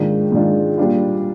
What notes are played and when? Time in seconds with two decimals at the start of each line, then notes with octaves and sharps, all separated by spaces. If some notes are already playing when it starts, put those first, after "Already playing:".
Already playing: G#2 D#3 G#3 D4 F4
0.32 G#2 D#3 G#3 D4 F4
0.78 A#2 G3 D4 F4